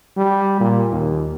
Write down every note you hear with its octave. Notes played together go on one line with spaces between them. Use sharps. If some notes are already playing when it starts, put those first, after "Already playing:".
G3
A#2
D#2